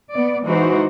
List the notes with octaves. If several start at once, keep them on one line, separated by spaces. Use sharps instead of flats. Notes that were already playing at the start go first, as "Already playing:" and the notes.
B3 D5
E3 G#3 D#4 F#4 C5